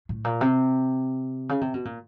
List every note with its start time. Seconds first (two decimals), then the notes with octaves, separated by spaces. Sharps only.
0.09 A2
0.24 A#2
0.41 C3
1.49 C#3
1.61 C3
1.74 B2
1.85 A#2